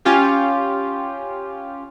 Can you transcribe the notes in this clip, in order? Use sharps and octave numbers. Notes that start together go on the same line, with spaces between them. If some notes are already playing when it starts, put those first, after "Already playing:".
C#4 F4 G4